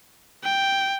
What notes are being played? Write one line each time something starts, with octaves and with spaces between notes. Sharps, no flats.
G5